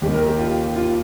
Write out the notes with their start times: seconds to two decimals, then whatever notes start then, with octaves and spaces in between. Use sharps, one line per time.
0.02 D#2 G4
0.06 D#3
0.14 A#4
0.26 G4
0.39 F4
0.76 F4